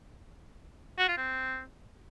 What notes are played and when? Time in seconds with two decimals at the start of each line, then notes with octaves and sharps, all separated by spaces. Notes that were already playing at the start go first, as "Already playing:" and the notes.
0.98 F#4
1.08 F4
1.17 C4